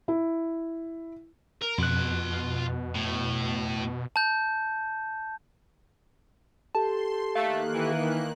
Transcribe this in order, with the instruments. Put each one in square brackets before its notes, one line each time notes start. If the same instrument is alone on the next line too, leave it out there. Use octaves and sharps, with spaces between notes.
[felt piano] E4
[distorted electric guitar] A#4
[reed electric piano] F2 F#6 [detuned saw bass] B2 [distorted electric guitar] F4 B5
[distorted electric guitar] A2
[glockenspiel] A5 G6
[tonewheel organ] G4 A4 [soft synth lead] A5 [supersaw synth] C6
[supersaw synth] D#3 A#3 F#6 [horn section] A3 [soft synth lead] F5
[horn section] E3